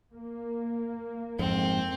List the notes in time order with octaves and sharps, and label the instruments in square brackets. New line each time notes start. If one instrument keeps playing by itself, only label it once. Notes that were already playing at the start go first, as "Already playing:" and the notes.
[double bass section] A#3
[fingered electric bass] F2 G#2 [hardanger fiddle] C4